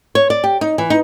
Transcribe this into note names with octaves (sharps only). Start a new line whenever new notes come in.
C#5
D5
G4
D#4
E3
D#4